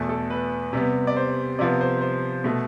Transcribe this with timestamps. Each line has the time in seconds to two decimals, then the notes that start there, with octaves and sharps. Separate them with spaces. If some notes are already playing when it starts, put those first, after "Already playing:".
Already playing: E2 B2 A3
0.09 A4
0.30 B4
0.73 C3 G3 B3
1.07 D5
1.16 C5
1.59 C3 F3 B3 D5
1.81 C5
2.01 C5
2.44 B2 A3